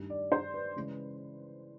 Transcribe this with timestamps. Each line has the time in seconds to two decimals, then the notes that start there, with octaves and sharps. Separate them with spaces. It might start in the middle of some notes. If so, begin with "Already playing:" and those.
Already playing: G2 D#3 G3
0.10 D5
0.32 C5
0.54 B4
0.76 C#3 E3 G#3 C#4